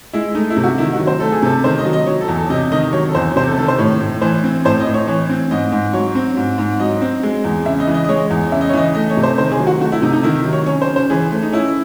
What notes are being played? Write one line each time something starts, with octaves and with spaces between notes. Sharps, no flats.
G#3 E4
A3 D#4
E4
C3
F#4
D#3 E4
F#4
F#3
C5
A3 A4
G#4
C3 A4
D#3 C5
D#5
F#3
D#5
F#3 C#5
A4
E2
A4
C3 D#5
D#3 D#5
F#3 C#5
A4
E2 C5
C3 C5
A4
D#3 A4
C5
A2 C#5
A2
E3 C5
C4
A2 C5
D#5
A2
C#5
E3 C#5
C4
G#2 D#5
G#2
F#3 C#5
C4
G#2
G#2
F#3 D#5
C4
G#3
E2
C#3 E5
D#5
E3
D#5
D#5
G#3 C#5
E2
C#3 E5
D#5
C#5
E3 D#5
A3 D#5
C#5
C3
C5
D#3 C5
G#4
F#3
F#4
A3 F#4
E4
C3 D#4
D#4
D#3 E4
F#3
C#5
C#4 C#5
C5
C#3
C5
E3 G#4
A3
D#4
C#4 E4